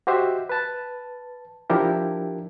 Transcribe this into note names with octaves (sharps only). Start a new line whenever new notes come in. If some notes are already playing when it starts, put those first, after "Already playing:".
F#4 G4 C5 D#5 E5
B4 A5
F3 D4 E4 G4 A#4